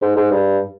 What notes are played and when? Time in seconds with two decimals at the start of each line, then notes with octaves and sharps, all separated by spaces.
0.02 G#2
0.16 G#2
0.31 G2